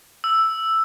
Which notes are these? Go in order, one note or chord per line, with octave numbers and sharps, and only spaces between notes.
E6